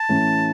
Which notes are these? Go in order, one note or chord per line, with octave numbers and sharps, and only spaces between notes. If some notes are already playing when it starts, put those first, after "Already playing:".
Already playing: A5
A2 E3 A3 C#4 E4